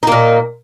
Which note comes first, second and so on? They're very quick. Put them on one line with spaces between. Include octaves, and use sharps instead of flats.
D#4 A#3 A#2